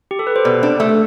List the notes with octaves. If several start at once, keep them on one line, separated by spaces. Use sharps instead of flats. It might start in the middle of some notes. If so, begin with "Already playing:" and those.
G4
A4
B4
C5
B2 D5
D4
A3